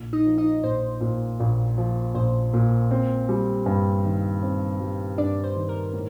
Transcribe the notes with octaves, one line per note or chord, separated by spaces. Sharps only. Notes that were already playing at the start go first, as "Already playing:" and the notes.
Already playing: A#1
D#4 D#5
F3
D#4 D#5
A#1 C5
A#2
A#1
F3
A#1 C5
A#2
C4
G3
G2
D#3
C4
G3
G2 D4 D5
C5
D#3
A#4
A2